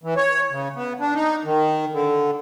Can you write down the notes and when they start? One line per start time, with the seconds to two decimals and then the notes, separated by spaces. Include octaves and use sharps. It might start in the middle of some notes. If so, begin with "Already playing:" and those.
0.03 E3
0.16 C#5
0.51 C#3
0.76 B3
1.00 D4
1.14 D#4
1.44 D#3
1.92 D3